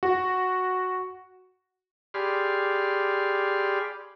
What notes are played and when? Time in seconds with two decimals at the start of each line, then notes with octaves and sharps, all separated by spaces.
0.03 F#4
2.14 G4 G#4 D5 B5 C6 F6